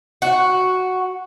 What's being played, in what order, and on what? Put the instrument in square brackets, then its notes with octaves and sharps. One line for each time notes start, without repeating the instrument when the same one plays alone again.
[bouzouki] F#4